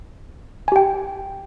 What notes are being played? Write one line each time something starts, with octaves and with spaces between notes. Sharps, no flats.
G4 G5 G#5